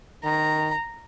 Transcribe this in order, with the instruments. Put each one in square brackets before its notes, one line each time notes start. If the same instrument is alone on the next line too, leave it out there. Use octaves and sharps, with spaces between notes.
[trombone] D#3 [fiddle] A#5